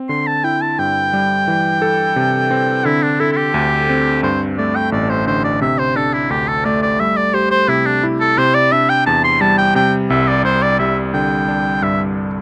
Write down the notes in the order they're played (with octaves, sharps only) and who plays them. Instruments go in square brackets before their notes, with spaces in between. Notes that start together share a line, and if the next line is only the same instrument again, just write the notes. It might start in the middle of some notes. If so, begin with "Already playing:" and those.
Already playing: [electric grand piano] C4
[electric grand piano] D3 [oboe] C6
[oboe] A5
[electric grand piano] E4 [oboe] G5
[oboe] A5
[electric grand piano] G2 [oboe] G5
[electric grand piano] G3
E3
A4
C3
C4
[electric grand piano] D3 [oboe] E4
[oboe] D4
[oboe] E4 [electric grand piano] A4
[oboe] E4
G4
[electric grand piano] D2
C4
[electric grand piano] G2 [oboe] C5
[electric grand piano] A3 [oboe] D5
[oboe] G5
[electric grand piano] A1 [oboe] D5
[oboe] C5
[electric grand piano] D3 [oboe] C5
[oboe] D5
[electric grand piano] C3 [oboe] E5
[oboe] C5
[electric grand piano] D4 [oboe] A4
[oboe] E4
[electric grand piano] D2 [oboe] G4
[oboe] A4
[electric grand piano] A3 [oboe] D5
[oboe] D5
[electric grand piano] G3 [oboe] E5
[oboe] D5
[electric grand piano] G4 [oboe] C5
[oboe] C5
[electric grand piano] C3 [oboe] E4
[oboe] D4
[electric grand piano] E4
[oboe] A4
[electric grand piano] C3 [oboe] C5
[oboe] D5
[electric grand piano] D4 [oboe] E5
[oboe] G5
[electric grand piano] E2 [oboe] A5
[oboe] C6
[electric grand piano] G3 [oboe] A5
[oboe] G5
[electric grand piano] C3 [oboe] G5
[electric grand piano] C2 [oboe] E5
[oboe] D5
[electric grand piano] C2 [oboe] C5
[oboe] D5
[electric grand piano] G3 [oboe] E5
[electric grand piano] D3 [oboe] G5
[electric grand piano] D4
[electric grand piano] G2 [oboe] E5